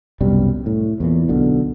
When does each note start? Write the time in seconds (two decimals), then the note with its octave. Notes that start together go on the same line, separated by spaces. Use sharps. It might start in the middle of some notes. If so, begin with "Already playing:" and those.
0.21 C2 F#2 B2 G3
0.66 A2
1.00 E2 A#2 E3
1.29 B1 B2 D3